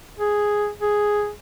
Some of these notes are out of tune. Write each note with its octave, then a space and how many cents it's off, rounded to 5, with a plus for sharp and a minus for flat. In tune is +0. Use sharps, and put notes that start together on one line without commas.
G#4 +0
G#4 +0